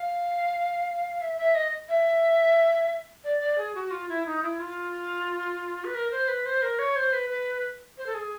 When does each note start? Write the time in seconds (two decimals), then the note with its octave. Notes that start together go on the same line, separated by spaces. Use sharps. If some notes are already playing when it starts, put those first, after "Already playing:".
Already playing: F5
1.21 E5
1.38 E5
1.55 D#5
1.89 E5
3.24 D5
3.40 D5
3.58 G#4
3.75 F#4
3.91 F4
4.09 E4
4.26 D#4
4.43 E4
4.59 F4
5.85 B4
5.95 A#4
6.11 C5
6.28 B4
6.46 C5
6.62 A#4
6.79 C#5
6.96 C5
7.13 B4
7.30 B4
7.98 C5
8.06 A4
8.14 G#4